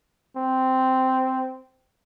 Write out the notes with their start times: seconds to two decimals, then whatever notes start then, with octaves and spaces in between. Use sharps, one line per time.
0.37 C4